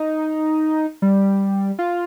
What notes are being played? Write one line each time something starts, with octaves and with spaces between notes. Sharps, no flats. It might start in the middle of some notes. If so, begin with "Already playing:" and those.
Already playing: D#4
G3
F4